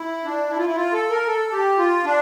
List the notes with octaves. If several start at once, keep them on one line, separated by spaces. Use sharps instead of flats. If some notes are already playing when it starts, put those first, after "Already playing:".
Already playing: E4
D4
E4
F4
E4
F4
A4
A#4
A4
G4
F4
D4